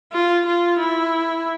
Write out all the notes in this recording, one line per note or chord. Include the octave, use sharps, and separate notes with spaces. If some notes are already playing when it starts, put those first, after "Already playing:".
F4
F4
E4